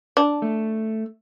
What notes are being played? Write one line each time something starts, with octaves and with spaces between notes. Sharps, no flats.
D4
A3